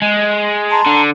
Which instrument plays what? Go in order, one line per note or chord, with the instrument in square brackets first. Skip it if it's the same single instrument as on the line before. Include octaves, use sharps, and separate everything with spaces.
[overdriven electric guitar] G#3
[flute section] A5 A#5 C6
[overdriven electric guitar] D3